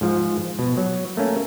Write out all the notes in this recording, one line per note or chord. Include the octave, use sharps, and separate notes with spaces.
G#2 F3
B2
F#3
A3 A#3 C#4